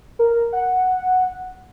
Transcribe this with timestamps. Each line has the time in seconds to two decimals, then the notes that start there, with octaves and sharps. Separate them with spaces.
0.19 A#4
0.53 F#5